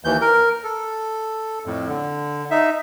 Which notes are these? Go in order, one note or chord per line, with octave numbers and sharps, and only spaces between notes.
D#2 E3 G6
A#4
A4
F2 A2
D3
D#4 E5